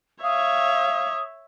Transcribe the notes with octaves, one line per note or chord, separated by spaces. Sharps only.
C#5 E5 F5 D#6